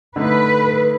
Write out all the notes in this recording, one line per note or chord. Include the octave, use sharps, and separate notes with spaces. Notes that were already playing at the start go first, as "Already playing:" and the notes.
D3 A3 D#4 B4